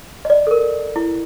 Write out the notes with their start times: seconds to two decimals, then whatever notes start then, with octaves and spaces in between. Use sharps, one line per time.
0.25 D#5
0.30 D5
0.47 A4
0.51 A#4
0.96 E4